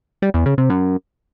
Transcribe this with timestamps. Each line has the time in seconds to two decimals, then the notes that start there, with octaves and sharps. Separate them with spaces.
0.22 G3
0.34 E2
0.46 C#3
0.58 C3
0.70 F#2